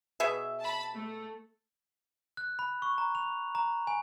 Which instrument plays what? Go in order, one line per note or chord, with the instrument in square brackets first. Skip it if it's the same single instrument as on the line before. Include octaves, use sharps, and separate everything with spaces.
[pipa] B2 G#4 E5
[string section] A5 B5
A3
[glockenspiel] F#6
B5
C#6
A#5
F7
A#5
G#5